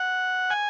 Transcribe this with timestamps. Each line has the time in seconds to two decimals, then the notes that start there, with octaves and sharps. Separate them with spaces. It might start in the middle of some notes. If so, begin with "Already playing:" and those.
Already playing: F#5
0.50 G#5